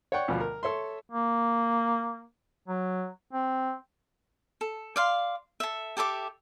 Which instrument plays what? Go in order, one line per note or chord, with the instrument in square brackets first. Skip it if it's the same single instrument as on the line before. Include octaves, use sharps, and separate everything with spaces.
[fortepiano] C#5 D5 F#5 G5 C#6
D2 B2 F3
A#4
A4 C#5 E5 C6
[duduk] A#3
F#3
C4
[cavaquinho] A4
D5 F5 C6
A4 E5
G4 A4 E5 D6